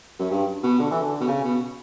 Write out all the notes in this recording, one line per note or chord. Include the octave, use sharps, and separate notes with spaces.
F#2
G2
B2
D3
E3
D3
B2
C#3
B2